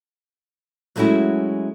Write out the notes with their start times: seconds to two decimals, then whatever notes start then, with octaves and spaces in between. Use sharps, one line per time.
0.96 F#3 G#3 A3 C#4 E4 F#4